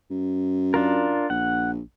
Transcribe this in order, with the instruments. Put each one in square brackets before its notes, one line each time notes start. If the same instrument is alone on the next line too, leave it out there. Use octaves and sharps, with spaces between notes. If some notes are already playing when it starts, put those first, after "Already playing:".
[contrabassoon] F#2
[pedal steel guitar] D4 F4 A#4
[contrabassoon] A#1 [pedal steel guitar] F#5